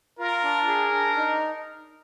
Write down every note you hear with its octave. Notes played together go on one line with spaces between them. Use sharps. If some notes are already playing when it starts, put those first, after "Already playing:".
F4 A#4
D4
G#4
D4
D#4